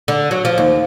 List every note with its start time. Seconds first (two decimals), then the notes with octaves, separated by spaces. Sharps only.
0.08 D3
0.31 F#3
0.45 F3
0.58 D#2